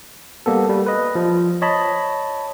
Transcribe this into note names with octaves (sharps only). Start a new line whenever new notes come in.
G3 A#3 B3 A4
G3
B4 D#5
F3
C#5 D#5 A5 B5